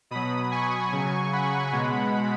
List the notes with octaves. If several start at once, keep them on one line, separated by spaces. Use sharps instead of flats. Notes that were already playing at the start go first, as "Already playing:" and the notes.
B2 F#3 B5 D#6
G#5 C#6
C#3 F#3
F#5 B5
B2 G#3